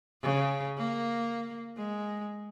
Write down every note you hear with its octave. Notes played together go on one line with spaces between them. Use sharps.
C#3
A#3
G#3